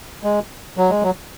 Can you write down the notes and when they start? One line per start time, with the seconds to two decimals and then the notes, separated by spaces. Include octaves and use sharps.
0.23 G#3
0.77 F#3
0.90 G#3
1.03 F#3